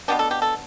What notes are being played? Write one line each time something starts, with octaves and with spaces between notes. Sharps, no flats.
B2 B3 D4 G4
A4
G4
A4